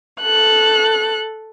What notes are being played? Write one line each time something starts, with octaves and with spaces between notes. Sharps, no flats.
A4 F#6